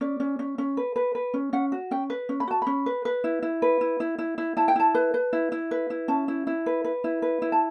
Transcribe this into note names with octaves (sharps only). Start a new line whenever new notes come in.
C#4 D5
C#4
C#4
C#4
B4
B4
B4
C#4
C#4 F#5
F#4
C#4 G5
B4
C#4
B5
F#4 A5
C#4 B5
B4
B4
E4
E4
B4
E4
E4
E4
E4
E4 A5
G5
E4 A5
B4
B4
E4
E4
B4
E4
C#4 A5
E4
E4
B4
B4
E4
B4
E4
A5